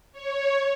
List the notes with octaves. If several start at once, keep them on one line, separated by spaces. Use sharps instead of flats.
C#5